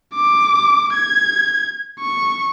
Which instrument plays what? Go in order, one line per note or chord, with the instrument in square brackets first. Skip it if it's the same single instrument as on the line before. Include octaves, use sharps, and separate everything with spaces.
[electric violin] D6
G#6
C#6